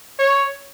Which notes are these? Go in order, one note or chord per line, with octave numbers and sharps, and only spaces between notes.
C#5